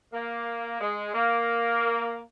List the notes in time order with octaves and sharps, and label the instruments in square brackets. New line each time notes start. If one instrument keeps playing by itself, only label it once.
[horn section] A#3
G#3
A#3